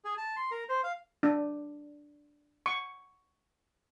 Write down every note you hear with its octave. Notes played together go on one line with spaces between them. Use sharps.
G#4
A5
C6
A#4
C5
F5
D4
C#6